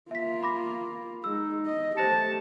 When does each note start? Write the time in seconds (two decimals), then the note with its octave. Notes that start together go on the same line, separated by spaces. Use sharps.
0.11 A#3 F4 E5 B6
0.43 B5 D6 A#6
1.24 G#3 D#4 E6
1.66 D#5
1.97 A3 G4 C5 A5 A#6 C#7